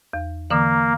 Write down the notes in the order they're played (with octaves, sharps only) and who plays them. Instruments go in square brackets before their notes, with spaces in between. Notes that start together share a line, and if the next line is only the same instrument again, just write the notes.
[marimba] E2
[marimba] D3 E3 [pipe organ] A#3